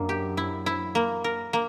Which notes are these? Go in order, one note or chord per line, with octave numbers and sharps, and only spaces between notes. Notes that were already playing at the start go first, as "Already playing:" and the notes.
Already playing: F#2 A#3 D4
G4
E4
E4
A#3
A#4
A#3